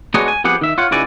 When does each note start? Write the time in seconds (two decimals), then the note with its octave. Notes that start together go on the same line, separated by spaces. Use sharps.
0.14 G#3 B3 D4 F#4 C#5 D#5
0.28 G#5
0.44 F2 B3 G4 G#4 F#5
0.61 D#3 E5
0.78 F4 C#5 F#5
0.91 C#2 G#2 E4 F#4 D5 G#5